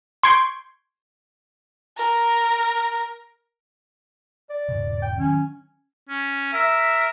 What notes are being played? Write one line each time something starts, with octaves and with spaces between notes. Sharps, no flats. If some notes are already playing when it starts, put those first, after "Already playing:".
C6 C#6 G6 G#6 D7
A#4
D5
E1 G#2 C#3
G5
D#3 F#3 C#4
C#4
A#4 E5